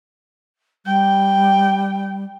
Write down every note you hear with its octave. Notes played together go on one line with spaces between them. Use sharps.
G3 G5